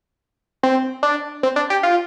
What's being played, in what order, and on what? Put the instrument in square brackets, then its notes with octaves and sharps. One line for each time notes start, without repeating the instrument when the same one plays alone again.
[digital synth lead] C4
D4
C4
D4
G4
F4